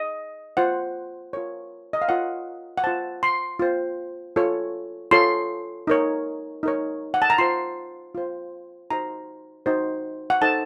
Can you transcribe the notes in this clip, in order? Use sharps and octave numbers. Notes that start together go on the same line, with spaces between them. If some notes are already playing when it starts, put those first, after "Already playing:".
Already playing: D#5
F4 C5 F#5
F4 A#4 C#5
D#5
F5
F4 A#4 C#5 F#5
F#5
F4 C5 A5
C6
F4 C5
F4 A4 C#5
F4 A4 C#5 C6
D#4 A#4 C#5
D#4 A#4 C#5
F#5
A5
A#5
F4 C5 C6
F4 C5
D#4 F#4 C5 A#5
D#4 F#4 C5
F#5
D#4 A4 C5 A5